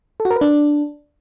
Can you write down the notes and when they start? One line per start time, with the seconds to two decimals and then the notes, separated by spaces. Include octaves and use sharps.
0.20 A4
0.25 F#4
0.31 A#4
0.36 B4
0.41 D4